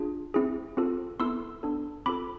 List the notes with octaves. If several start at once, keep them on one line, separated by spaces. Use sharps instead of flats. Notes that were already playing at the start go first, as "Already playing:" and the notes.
Already playing: D4 F4 G#4
C4 E4 G#4
C4 F4 A4
B3 E4 A4 C6 E6
B3 D4 A4
C4 F4 A4 B5 D6